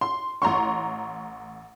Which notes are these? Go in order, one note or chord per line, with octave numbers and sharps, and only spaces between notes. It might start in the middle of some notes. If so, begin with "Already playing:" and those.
C6
A1 A#5 C6 C#6